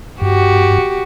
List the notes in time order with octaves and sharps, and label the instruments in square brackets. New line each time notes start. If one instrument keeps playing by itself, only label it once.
[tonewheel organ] G2 [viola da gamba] F#4 G4